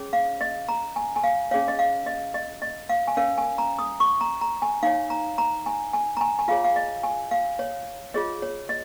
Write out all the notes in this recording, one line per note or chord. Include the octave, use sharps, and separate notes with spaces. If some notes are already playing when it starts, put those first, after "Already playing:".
Already playing: C#4 G#4 C#5
F5
D#5
A#5
G#5
G#5
F5
C#4 G#4 C#5 F5
D#5
F5
D#5
D#5
D#5
F5
G#5
C#4 A#4 C#5 F5
G#5
A#5
D#6
C#6
A#5
A#5
G#5
D#4 C#5 F5
A#5
A#5
G#5
G#5
A#5
G#5
G#5
F4 G#4 C#5 F5
F5
D#5
G#5
F5
C#5
F4 G#4 C#5 D#5
C#5
D#5